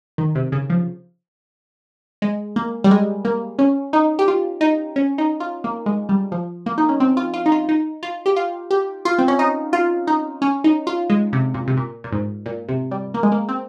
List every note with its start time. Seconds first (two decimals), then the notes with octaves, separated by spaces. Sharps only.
0.18 D#3
0.35 C3
0.52 C#3
0.70 F3
2.22 G#3
2.56 A#3
2.84 G3
2.91 G#3
3.25 A#3
3.59 C#4
3.93 D#4
4.19 G4
4.28 F4
4.61 D#4
4.96 C#4
5.18 D#4
5.40 F4
5.64 A#3
5.86 G#3
6.09 G3
6.32 F3
6.66 A#3
6.78 D#4
6.89 C#4
7.00 C4
7.17 F4
7.34 F4
7.46 D#4
7.52 F4
7.69 D#4
8.03 F4
8.26 G4
8.36 F4
8.71 G4
9.05 F4
9.18 C4
9.28 C#4
9.39 D#4
9.73 F4
10.07 D#4
10.42 C#4
10.64 D#4
10.87 F4
11.10 G#3
11.33 C3
11.54 A#2
11.67 C3
11.77 A#2
12.04 A#2
12.12 G#2
12.46 A#2
12.69 C3
12.91 G3
13.14 A#3
13.23 G#3
13.32 A#3
13.49 C4